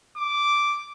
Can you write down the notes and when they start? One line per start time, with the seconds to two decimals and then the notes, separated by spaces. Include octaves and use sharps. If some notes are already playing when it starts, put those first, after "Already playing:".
0.17 D6